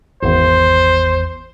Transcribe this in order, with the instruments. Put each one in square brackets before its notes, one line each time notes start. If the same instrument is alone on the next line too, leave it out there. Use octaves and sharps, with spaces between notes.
[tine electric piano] G#1 E2 [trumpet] C5